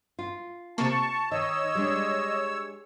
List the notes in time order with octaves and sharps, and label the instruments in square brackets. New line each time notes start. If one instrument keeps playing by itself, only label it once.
[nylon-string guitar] F4
[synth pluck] C3 A#3 [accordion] A5 [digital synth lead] C#6
[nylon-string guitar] D#3 [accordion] C#5 E6 [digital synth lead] D#5
[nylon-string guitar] G3 G#3 D4